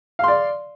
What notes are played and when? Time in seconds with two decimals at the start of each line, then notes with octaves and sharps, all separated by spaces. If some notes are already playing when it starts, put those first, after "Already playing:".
0.19 F5
0.24 C6
0.28 D5